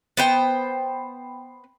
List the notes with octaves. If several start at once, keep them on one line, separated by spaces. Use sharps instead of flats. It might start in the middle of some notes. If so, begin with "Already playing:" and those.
B3 C5 G5